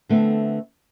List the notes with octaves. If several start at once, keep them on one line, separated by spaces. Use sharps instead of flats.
D3 A3 B3 C4